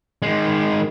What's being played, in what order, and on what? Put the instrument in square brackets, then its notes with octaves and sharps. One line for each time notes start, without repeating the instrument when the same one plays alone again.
[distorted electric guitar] D#3 G#3